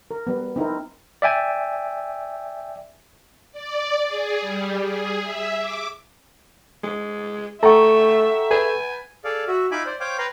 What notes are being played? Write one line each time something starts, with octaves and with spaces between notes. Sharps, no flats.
A#4
G3 B3
C4 D#4 E4 A#4
D5 E5 G5 G#5
D5
G#4
G3
G#4
E5
D6
G#3
A3 A4 E5 F#5 G5 A#5 C#6
B4 G#5
G#4 A4 D5 F5
F#4 E5
D#4 F4 E5 G#5 B5 D6
C5 D5
C5 C#5 F5 G5 D6
B4 G5 A#5 C6